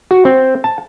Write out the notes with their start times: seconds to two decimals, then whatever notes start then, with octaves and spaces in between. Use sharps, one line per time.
0.11 F#4
0.25 C4
0.64 A5